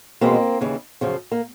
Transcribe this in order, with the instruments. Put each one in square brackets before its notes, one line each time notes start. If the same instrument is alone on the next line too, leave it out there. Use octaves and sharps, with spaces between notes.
[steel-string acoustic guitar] E2 B2 G#3 A#3 C4
D#2 C#3 E3
F#2 C#3 F3
A#3